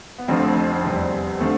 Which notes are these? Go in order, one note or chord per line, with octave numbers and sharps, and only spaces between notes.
B3
F1 F2 D3 F3 A3 C4
E2 C3 G3
D3 F3 A3 C4